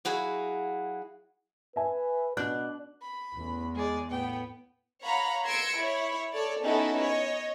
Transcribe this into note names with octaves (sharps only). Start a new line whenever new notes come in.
F#3 E4 F#4 G#4 F5
B4 E5 G#5
B2 D4 F#6
B5
A1 E2 E3
G#3 G#4 D5
A2 A3 B3 G5
C#5 F5 F#5 A#5 B5
C6 E6 G#6 A#6 C#7 D7
E4 C#5
A4 C#5 D5
B3 C#4 D#4 E4 F#4 A4
C#5 D#5